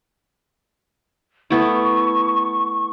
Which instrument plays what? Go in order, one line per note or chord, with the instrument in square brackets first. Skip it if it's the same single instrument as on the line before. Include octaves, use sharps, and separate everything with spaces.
[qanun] A3 B3 E4 [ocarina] C#6